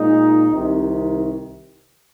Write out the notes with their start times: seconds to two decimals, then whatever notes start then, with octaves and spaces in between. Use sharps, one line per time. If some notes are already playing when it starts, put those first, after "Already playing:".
Already playing: A#2 G#3 D#4
0.51 C2 C3 D#3